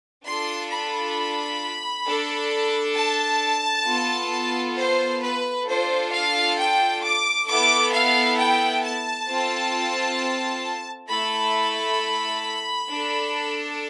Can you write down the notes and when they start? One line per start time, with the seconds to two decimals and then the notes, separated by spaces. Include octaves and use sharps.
0.25 D4 F4 A4 C6
0.70 B5
2.06 D4 A4
2.96 A5
3.86 B3 F4 A4
4.77 C5
5.22 B4
5.67 D4 F4 A4 C5
6.12 F5
6.58 G5
7.02 D6
7.47 B3 E4 A4 D6
7.93 F5
8.38 G5
8.83 A5
9.29 C4 F4 A4
11.09 A3 E4 A4 B5
12.89 D4 A4